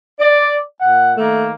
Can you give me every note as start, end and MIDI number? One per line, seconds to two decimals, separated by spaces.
0.19 0.56 74
0.81 1.13 46
0.81 1.13 78
1.17 1.50 51
1.17 1.50 57
1.17 1.50 58